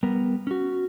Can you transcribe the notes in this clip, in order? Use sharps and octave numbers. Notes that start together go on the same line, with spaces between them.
G3 B3 A#4
C#4 F#4